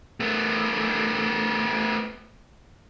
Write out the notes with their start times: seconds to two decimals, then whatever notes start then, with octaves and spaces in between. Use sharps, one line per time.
0.20 A3 B3